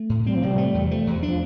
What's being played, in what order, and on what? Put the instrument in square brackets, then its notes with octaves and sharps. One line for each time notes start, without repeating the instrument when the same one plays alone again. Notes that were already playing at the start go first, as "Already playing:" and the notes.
Already playing: [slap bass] A3
A2
[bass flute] G3 [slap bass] C4
[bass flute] F3
[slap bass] C3 [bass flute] G3
[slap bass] A3
E2
[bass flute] F3 [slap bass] A3
[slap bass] E2
[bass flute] F3 [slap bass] D4